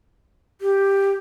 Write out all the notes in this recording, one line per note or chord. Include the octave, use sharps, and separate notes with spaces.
G4